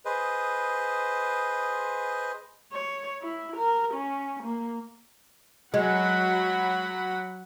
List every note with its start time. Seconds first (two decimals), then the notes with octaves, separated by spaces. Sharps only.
0.05 G#4 B4 C5 D#5
2.72 C#5
3.22 E4
3.56 A#4
3.94 C#4
4.43 A#3
5.74 F#3 G#3 F#5 B5